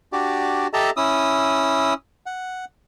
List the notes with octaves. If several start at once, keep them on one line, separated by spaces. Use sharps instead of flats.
D4 F#4 G4 D5
G4 A4 D#5 E5 A5 A#5
C#4 E4 D#6 E6
F#5